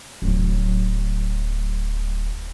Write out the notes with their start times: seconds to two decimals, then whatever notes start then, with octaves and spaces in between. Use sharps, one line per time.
0.22 D1 F#3